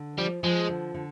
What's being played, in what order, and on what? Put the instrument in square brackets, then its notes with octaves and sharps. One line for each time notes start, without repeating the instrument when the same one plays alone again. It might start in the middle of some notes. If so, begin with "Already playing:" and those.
Already playing: [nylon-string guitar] D3
[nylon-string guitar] F3 [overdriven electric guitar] G3
[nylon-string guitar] F3 [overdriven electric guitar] G#3
[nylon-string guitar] D3
D3